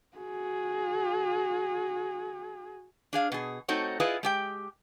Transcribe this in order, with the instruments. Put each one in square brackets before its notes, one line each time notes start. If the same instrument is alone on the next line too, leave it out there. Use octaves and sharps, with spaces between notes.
[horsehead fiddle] F#4 G#4
[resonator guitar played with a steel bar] D4 G#4 F5
B2 G#4
A3 C4 D#4 F#4 A4 C#5
E4 F4 G#4 B4 D#5
G#3 G4 G5